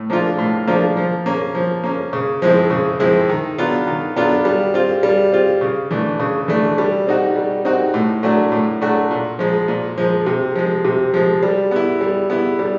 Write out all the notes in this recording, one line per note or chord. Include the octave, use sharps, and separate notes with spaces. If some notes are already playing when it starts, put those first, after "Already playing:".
Already playing: A2
F3 A#3 D4 F4
A2
F3 A#3 D4 F4
F3
A#3 C#4
F3
A#3 C#4
C#3
F3 G#3 C4 E4
C#3
F3 G#3 C4 E4
D#3
F#3 B3 D4 F4
D#3
F#3 B3 D4 F4
G3
C4 F4
G3
C4 F4
C#3
E3 A3 D4
C#3
E3 A3 D4
G3
C4 D#4 F#4
G3
C4 D#4 F#4
A2
F#3 A3 D4 F#4
A2
F#3 A3 D4 F#4
A#2
F3 G#3
A#2
F3 G#3
C3
F3 G#3
C3
F3 G#3
G3
B3 E4
G3
B3 E4
G3